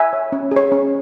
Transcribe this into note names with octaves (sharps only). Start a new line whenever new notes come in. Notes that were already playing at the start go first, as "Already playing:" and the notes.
Already playing: E5 G#5
C#5
C#4
G#4 C#5
C#4